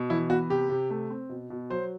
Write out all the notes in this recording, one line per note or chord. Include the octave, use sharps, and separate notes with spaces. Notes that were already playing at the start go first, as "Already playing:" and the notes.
Already playing: B2
E3 E4
B3 F#4
C3 G4
C3
A3
C4
B2
B2
F#3 C5